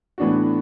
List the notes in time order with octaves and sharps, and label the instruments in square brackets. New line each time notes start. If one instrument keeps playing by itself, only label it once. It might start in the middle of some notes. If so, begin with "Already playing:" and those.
[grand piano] A2 E3 B3 D4 F#4